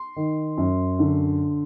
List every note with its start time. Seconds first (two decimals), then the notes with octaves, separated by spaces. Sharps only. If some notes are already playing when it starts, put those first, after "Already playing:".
Already playing: C6
0.16 D#3
0.57 F#2
0.99 D3